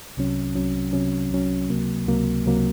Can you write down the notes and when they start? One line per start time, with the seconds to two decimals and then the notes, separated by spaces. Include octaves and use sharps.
0.17 C2 C3 F#3 C#4
0.56 C2 C3 F#3 C#4
0.93 C2 C3 F#3 C#4
1.31 C2 C3 F#3 C#4
1.70 C#2 C3 F#3 A#3
2.07 C#2 C3 F#3 A#3
2.45 C#2 C3 F#3 A#3